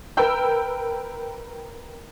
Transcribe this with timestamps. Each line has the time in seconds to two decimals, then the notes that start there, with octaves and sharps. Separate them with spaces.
0.17 A#4 B4 G5 E6 G6